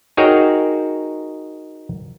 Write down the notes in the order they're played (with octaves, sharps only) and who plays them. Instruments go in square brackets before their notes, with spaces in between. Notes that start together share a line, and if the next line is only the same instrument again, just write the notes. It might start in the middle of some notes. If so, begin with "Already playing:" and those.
[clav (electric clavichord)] D#4 F#4 G#4 A#4 C#5 G5